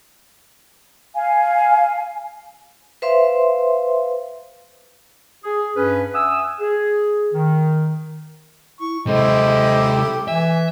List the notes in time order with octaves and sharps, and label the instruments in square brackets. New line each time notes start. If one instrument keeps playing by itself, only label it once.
[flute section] F5 G#5
[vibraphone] B4 C5 E5 F5 C6
[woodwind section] G#4
G2 C#4 B4
E5 F#5 G#5 D#6 E6
G#4
D#3
[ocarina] E4 [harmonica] C#6
[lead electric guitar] C3 G#3 [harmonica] E4 G4 [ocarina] A4 [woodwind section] C5 D#5
[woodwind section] E3 [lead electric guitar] E5 [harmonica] G#5